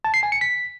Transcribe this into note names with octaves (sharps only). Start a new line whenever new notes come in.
A5
C7
G#5
C#7
B6